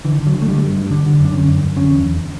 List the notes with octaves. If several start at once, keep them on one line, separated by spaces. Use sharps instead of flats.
D3 E3
D3
F#3
D3
A3
D3 G3
G2
G2
D3 D4
D3
F#2
D4
D3 C#4
F#2
F#2
D3 C#4
E2
E2